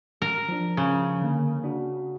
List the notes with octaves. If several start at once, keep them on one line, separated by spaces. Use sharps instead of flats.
A#4
F3 D4
C#3
D3 A#3
D4 F#4